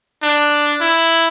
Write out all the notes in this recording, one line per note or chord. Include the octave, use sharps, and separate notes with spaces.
D4
E4